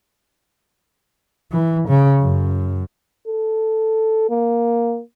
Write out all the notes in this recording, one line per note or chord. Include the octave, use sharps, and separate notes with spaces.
E3
C#3
F#2
A4
A#3